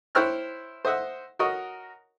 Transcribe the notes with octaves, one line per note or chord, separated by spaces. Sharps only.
E4 C5 C#5 G5 F6 F#6
C5 D#5 E5 F#5
F#4 A#4 C#5 D#5